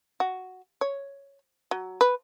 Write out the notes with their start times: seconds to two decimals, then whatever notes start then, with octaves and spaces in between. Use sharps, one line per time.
0.20 F#4
0.81 C#5
1.71 F#3
2.01 B4